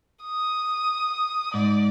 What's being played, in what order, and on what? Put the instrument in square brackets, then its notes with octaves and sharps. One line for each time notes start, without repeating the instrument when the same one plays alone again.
[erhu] D#6
[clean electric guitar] G#2 [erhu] D5